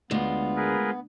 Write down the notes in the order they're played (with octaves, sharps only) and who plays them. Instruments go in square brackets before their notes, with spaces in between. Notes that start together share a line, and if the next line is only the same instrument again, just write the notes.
[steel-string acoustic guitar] D2 [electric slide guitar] G#3 F4 [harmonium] B3
[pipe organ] G#4 A#4 B4